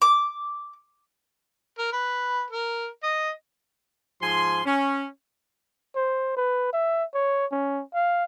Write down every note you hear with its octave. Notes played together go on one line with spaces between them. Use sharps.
D6
A#4
B4
A#4
D#5
G#2 F3 G#5 C6
C#4
C5
B4
E5
C#5
C#4
F5